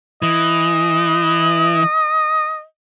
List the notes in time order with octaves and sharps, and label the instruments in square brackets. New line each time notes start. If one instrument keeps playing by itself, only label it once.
[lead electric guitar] E3 [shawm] D#5